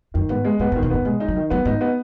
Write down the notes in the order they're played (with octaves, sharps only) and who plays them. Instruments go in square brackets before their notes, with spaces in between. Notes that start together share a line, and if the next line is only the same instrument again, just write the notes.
[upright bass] F#2 [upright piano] D#3
[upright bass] G#2 [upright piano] B3
[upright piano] G#3
[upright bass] G#2 [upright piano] B3
[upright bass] G#2
[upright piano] D#3
[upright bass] B2
[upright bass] G#2 [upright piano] B3
[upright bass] B2 [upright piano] G#3
[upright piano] D#4
[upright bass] F#3
[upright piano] D#3
[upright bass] F#3 [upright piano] B3
[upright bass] G#2 [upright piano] D#4
[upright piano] B3